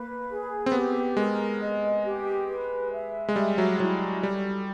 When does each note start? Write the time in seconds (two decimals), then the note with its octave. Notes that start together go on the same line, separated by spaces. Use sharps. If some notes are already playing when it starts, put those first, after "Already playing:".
Already playing: A#3 B4
0.28 G#4
0.66 C4
0.72 B3 G4
1.16 G#3 A#4
1.60 D#5
2.04 G4
2.48 B4
2.92 E5
3.28 G#3
3.36 G3 E5
3.58 F#3
3.80 F#3 E4
4.23 G3 A4